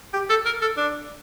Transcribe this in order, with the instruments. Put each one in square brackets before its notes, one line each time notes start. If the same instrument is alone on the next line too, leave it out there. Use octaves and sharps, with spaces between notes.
[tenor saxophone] G4
A4
A#4
A4
D4